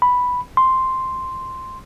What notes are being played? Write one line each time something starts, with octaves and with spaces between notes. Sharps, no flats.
B5
C6